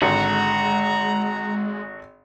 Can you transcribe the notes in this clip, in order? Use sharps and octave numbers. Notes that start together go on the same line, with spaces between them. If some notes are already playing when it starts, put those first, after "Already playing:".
G#1 D3 G#3 F#4 A#5